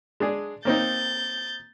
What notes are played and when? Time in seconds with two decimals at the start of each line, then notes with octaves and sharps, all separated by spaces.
0.20 G#3 D4 G#4
0.65 A#3 C4 D#4 G6 A6